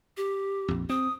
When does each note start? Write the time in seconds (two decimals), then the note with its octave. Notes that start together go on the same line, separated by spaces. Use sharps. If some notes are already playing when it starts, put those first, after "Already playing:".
0.17 G4
0.68 A#1 F2
0.89 C4 D#6